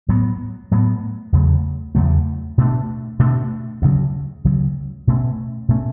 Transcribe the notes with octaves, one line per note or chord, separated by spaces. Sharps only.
A2 F#3 B3
A2 F#3 B3
E2 C#3 F#3 A3
E2 C#3 F#3 A3
B2 A3 D4
B2 A3 D4
D2 C#3 F#3
D2 C#3 F#3
B2 A3 C#4
B2 A3 C#4